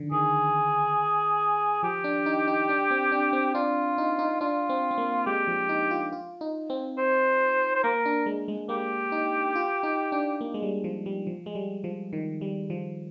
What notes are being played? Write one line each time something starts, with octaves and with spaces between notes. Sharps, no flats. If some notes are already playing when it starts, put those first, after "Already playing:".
Already playing: D3 D#3 F3
D#3 G#4
F3 G4
D4
D#4
D#4
D4
C4
D4
C4
D4 F4
D#4
D#4
D4 F4
C4
C4
A#3
G#3 G4
F3
D#4
F4
F4
D#4
C4
C5
C5
A#3 A#4
D4
G#3
G#3
A#3 G4
D#4
F4
D#4
D4
A#3
G#3
G3
F3
G3
F3
G#3
G3
F3
D#3
G3
F3